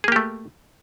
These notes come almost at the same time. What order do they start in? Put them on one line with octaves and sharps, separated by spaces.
G#4 A#3 G4 A3